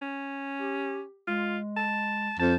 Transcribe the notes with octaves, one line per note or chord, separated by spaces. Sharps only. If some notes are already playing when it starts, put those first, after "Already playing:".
C#4
G4
G#3 F4
A5
F2 A5 G6